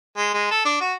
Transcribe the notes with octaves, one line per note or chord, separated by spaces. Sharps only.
G#3
G#3
A4
D4
F#4